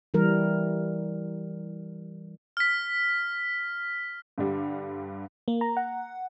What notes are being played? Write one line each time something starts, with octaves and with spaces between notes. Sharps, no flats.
E3 G3 A#4
F6 B6
G2 D3 G3
A#3
A#5
F#5